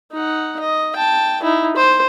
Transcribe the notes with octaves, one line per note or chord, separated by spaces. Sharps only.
D#4 F#5
D#5
G5 A5
D#4 E4
C5